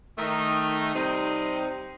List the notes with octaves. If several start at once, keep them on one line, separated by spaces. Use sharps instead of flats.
D#3 A3 D#4
C3 G3 C4 D#4